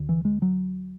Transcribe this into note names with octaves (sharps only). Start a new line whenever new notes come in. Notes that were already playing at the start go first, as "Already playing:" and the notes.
Already playing: D2 D3
E3
G#3
F#3